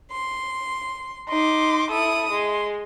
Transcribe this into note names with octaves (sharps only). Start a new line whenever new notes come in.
C6
D#4 C6 D6
E4 A4 D#6
G#3 C6